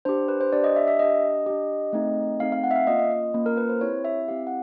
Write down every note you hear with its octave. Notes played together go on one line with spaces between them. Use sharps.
D4 G4 C5
B4
C5
D4 G4 D5
D#5
E5
E5
D4 G4 D#5
D4 G4
A3 C4 D#4 G#4
A3 C4 D#4 G#4 F5
F5
F#5
E5
F5
A#3 C#4 F4 D#5
D#5
D#5
A#3 C#4 F4
A#4
B4
C5
C4 E4 G4 C#5
E5
C4 E4 G4 F5
F#5